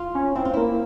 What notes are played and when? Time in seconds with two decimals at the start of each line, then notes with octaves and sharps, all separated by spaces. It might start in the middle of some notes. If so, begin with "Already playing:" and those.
Already playing: F4
0.15 C#4
0.35 C4 E4
0.45 F4
0.54 A#3 E4